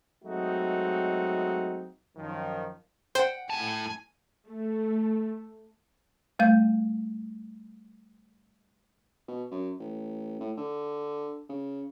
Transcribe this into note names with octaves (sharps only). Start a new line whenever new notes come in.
F#3 G#3 A3 C4 D#4 F#4
F#2 D#3 F3
C5 F#5 G5
A2 G#5 A5
A3
G3 A3 F5 G6
B2
F#2
A1
A2
D3
C#3